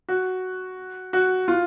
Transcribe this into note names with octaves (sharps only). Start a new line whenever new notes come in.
F#4
F#4
F4